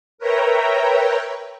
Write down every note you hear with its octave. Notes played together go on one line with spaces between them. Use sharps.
A#4 B4 C#5 E5 G5 A#5